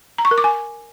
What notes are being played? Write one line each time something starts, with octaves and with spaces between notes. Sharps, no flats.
A#5
C#6
A#4
D6
G#5